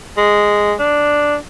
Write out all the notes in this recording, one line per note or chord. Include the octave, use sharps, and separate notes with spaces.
G#3
D4